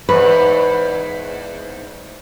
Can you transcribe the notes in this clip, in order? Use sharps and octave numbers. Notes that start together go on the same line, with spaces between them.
E2 G#2 B4